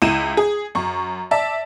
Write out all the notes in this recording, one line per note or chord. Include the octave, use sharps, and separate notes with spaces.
C#2 E4 D#7 E7
G#4
F#2 C#6
D5 E5 A5